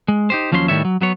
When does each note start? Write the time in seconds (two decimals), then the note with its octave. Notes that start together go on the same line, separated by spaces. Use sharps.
0.08 G#3
0.30 D#4 G4 C5
0.52 D#2 F3 F#3 C#4 E5 C6
0.68 A2 D#3 G3 C#5 E5
0.85 F#3
1.01 F#3 B3 C#5